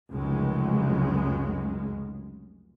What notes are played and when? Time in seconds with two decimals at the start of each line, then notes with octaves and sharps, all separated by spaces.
0.12 F1 C#2 F#2 C#3 G#3